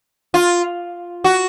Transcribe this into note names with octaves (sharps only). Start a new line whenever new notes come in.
F4
F#4